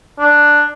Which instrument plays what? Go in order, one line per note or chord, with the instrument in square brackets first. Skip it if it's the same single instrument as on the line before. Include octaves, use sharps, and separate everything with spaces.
[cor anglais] D4